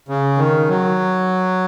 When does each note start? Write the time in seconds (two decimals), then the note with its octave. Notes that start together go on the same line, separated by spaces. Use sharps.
0.09 C#3
0.38 D#3
0.69 F#3